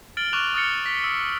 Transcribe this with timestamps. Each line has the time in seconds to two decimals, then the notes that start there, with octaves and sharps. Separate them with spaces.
0.17 F6 A6 D7 F#7 G7
0.33 C#6 D6 F6 F#6 F7
0.54 D#6 F6 A6 C#7
0.86 B6
1.04 E6